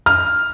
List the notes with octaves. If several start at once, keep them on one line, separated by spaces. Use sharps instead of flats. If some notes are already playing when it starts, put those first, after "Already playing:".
F6